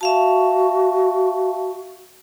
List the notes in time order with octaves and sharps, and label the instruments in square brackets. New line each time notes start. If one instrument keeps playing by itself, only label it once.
[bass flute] F#4 [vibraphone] E5 F5 A5